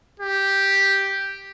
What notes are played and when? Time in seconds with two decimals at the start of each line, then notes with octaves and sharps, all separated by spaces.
0.20 G4